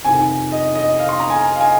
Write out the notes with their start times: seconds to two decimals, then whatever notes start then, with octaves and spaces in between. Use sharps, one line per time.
0.05 F2 C3 D#3 G#5
0.52 D#5
0.75 D#5
0.99 F5
1.09 C6
1.20 A#5
1.30 G#5
1.56 F5
1.60 G#5